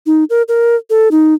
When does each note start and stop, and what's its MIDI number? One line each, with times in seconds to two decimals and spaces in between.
0.06 0.24 63
0.30 0.42 70
0.48 0.76 70
0.90 1.08 69
1.11 1.34 63